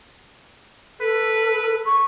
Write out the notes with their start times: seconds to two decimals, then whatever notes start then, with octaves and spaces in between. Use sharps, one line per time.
1.01 A4 B4
1.85 C#6